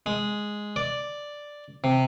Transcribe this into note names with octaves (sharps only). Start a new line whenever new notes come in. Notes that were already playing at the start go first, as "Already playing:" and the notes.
G#3
D5
C3